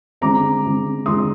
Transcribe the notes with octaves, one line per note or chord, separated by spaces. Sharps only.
D3 G#3 C4 A#5 D6
D3 G#3 C4
D3 G#3 C4 C6 D#6